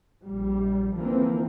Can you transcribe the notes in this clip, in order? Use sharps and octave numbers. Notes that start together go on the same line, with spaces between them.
A#1 G3
D3 E3 F3 A#3 C4